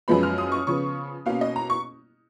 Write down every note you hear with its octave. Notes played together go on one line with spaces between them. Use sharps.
F#2 F3 G#3 B3 B5
F6
D#6
C#6
C#3 F3 B3 C#6
B2 A#3 C#4 F5
D#5
A#5
C#6